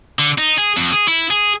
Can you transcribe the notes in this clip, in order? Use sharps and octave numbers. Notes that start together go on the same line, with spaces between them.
D3
D#4
G#4
F2
G#4
E4
G#4